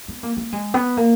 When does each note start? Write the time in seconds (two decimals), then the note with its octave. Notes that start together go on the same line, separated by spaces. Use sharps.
0.08 B3
0.23 A#3
0.37 A#3
0.53 G#3
0.74 B3
0.97 A#3